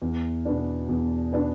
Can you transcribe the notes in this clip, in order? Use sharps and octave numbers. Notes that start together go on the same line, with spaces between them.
E2
B2 B3 D4
E2
B2 B3 D4